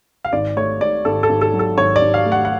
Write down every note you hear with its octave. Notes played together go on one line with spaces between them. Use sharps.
F5
G#1 D5
A3 C#5
G#2 D5
G#1 A4
A4
G#1
A4
F#3
A4
G#1 C#5
D5
G#1
F5
A3
F#5
F#5